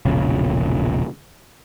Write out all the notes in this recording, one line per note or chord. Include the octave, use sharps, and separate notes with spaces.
E1 A#1 C#3